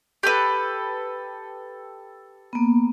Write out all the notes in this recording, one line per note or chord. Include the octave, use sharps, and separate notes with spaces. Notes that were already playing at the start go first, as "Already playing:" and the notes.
G4 A4 B4
A#3 B3